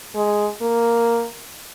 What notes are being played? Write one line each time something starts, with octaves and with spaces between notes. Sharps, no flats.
G#3
A#3